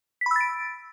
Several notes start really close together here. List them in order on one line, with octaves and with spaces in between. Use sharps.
B6 B5 E6 A6 D7